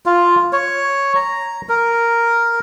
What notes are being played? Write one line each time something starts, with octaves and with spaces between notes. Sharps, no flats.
F4
C#5
A#5
A#4